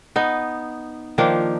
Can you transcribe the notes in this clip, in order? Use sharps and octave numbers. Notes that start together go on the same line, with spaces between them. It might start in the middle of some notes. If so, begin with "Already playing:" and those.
B3 D#4
D#3 F3 A#3 D4